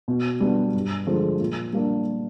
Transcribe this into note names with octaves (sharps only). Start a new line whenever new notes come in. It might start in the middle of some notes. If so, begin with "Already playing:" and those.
B2
G3 B3 D4
G2
D3 F3 G#3
A#2
G3 A#3 D4